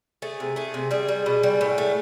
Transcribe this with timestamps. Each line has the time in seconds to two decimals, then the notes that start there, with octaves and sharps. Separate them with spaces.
0.22 A3 G#4
0.40 C3
0.56 A3 G#4
0.74 C3
0.91 G3 G#4
1.08 G3
1.26 B2
1.43 G3
1.61 A2
1.78 A3